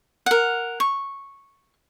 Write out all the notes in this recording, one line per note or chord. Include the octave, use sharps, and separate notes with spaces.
A#4 F#5
C#6